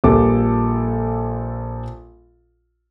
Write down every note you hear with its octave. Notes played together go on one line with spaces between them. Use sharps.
A#1 G3 A#3 F4 A4 D6